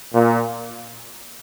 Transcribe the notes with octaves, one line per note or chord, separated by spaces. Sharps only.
A#2